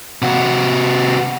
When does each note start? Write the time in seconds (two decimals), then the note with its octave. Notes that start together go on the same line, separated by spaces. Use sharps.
0.22 C3 F#4